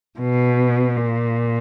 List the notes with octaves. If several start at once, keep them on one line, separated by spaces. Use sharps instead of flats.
B2
A#2